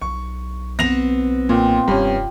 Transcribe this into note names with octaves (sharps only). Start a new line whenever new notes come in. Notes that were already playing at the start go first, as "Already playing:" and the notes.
B1 C#6
B3 C4 A#6 F7
A#2 F4 G5 C6
F1 G2 C#4